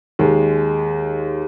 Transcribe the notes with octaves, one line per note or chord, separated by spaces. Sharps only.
D#2 G#3